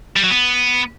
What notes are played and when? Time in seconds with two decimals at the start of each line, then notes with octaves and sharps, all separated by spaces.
0.16 G3
0.23 F#3
0.31 B3